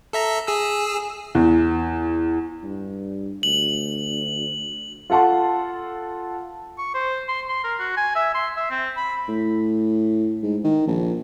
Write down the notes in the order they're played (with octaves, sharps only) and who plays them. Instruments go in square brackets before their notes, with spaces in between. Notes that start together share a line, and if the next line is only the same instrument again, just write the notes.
[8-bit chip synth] A4 E5 A#5
G#4 E6
[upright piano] E2
[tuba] G2
[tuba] D2 [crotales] F#7
[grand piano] F4 A4 F#5 A5 C6
[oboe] C#6
C5
C6
C6
A#4
F#4
G#5
E5
C6
E5
C4
B5
[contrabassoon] A2
G#2
D#3
A#1